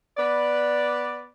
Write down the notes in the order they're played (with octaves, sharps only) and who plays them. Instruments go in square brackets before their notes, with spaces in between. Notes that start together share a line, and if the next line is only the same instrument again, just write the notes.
[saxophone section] B3 B4 D5